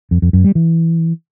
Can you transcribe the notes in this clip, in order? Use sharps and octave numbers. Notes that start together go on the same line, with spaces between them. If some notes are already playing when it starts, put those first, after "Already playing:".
F2
F2
F#2
G3
E3